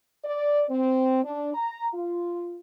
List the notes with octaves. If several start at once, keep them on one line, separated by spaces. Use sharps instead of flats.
D5
C4
D4
A#5
F4